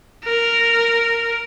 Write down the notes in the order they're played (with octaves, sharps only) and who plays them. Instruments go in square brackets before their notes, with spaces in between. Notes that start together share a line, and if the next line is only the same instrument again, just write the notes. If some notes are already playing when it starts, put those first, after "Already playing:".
[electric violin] A#4